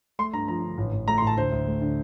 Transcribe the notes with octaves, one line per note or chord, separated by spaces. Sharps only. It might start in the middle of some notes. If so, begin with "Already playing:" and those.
A3 C6
G2 A#5
F3 A#5
D3
A1
A1
A3 A#5
C6
A2 A5
D2 C5
D2
A3
D3